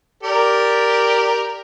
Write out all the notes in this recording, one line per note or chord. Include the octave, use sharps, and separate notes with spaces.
G4 A#4 D5